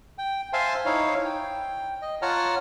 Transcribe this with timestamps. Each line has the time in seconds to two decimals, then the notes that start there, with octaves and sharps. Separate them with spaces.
0.18 G5
0.53 C5 E5 F5 G#5 A5 C6
0.85 D#4 E4 C#5 F5
1.25 G5
2.02 D#5
2.22 F4 C#5 F#5 A5 A#5 F6